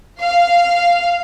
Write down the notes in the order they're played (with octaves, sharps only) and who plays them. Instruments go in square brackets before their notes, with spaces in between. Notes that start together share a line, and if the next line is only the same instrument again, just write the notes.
[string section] F5